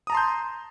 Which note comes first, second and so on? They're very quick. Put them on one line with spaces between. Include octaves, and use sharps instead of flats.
D#6 A#5 A5 C6 G6